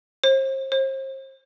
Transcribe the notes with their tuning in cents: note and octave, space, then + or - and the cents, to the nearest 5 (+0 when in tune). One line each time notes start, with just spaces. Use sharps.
C5 +35
C5 +35